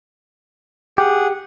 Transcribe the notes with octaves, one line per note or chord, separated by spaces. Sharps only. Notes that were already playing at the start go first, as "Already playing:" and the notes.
G4 G#4 F#5